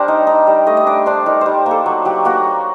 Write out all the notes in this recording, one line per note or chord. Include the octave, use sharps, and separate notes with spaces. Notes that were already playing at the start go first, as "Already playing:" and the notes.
Already playing: G3 D4 G4 A#4 C5
D#4
D#4
G3
A3 D#5
D#5
D4 D5
D4 C5
D#4 A#4
G3 C5
A#3 A4
F#3
F#3 G4
A#3 F#4